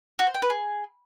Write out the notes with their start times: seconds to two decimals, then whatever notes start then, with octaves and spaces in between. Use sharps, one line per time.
0.19 F#4
0.27 C5
0.34 G5
0.42 B4
0.50 G#4